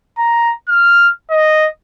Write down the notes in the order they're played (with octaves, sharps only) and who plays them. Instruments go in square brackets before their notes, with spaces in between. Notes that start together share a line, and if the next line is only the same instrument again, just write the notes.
[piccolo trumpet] A#5
F6
D#5